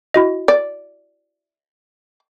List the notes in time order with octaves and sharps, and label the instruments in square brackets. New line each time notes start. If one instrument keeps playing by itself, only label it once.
[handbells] E4 F#4 D#5
[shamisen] D5